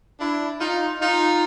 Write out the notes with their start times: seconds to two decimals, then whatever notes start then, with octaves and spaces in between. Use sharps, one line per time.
0.20 D4 E4
0.60 D#4 F4
1.00 D#4 F4